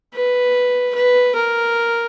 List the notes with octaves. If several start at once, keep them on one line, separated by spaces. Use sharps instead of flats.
B4
B4
A#4